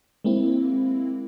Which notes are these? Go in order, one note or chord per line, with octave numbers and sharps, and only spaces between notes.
G#3 A#3 C4 E4